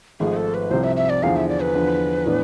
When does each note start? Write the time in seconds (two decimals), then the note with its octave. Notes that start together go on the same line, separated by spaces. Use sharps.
0.20 G#1 G#2 F3 A3 G#4
0.36 A4
0.54 B4
0.71 C2 C3 F3 C5
0.84 E5
0.96 E5
1.09 D5
1.23 E2 D3 F3 F5
1.36 E5
1.49 D5
1.61 B4
1.74 E2 D3 F3
2.26 A2 E3 B3 D4